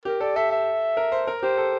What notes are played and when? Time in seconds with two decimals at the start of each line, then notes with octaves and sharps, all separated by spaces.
0.05 G4 A#4
0.20 A4 D5
0.36 A4 E5
0.51 E5
0.97 A#4
1.12 C5
1.27 A#4
1.42 G4 C5
1.58 A4